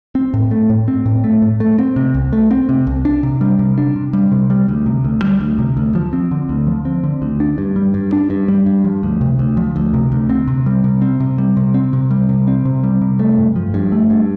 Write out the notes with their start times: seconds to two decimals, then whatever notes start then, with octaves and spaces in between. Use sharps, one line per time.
0.15 C4
0.34 A2
0.51 A3
0.69 A2
0.88 C4
1.06 A2
1.24 A3
1.42 A2
1.60 A3
1.78 C4
1.96 C3
2.14 C2
2.33 A3
2.51 C4
2.69 C3
2.87 C2
3.05 D4
3.23 C3
3.41 G3
3.59 C3
3.78 D4
3.96 C3
4.13 G3
4.32 C3
4.50 G3
4.68 D2
4.86 C3
5.04 D2
5.22 G3
5.41 D2
5.59 C3
5.77 D2
5.95 F3
6.13 C4
6.31 D3
6.49 D2
6.67 F3
6.85 C4
7.03 D3
7.22 D2
7.40 D4
7.58 G2
7.76 G3
7.94 G2
8.13 D4
8.30 G2
8.48 G3
8.66 G2
8.84 F3
9.03 D2
9.21 C3
9.39 D2
9.57 F3
9.76 D2
9.94 C3
10.12 D2
10.29 C4
10.48 C3
10.66 G3
10.84 C3
11.02 C4
11.20 C3
11.38 G3
11.57 C3
11.74 C4
11.93 C3
12.11 G3
12.29 C3
12.47 C4
12.65 C3
12.83 G3
13.01 C3
13.19 A3
13.38 G2
13.56 F3
13.74 G2
13.92 A3
14.10 G2